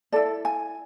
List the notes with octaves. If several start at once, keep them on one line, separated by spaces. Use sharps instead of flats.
E4 A4 D5
G#5